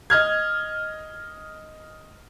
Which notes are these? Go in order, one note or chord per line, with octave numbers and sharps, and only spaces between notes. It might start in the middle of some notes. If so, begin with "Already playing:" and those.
D#5 F6 G#6